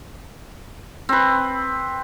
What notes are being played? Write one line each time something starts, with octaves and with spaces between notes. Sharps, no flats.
C4 B4